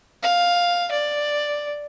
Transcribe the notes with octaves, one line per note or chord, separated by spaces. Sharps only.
F5
D5